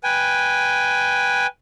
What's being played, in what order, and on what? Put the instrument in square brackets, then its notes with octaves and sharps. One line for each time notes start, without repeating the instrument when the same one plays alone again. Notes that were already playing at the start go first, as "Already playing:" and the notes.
[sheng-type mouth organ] B4 G5 G#5